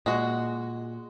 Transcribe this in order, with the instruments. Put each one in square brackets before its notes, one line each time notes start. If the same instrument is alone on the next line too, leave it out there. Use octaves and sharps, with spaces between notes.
[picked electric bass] A#2 [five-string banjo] G#3 F#4